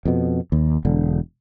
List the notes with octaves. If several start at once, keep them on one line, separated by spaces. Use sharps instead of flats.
F2 B2
D#2
E1 D3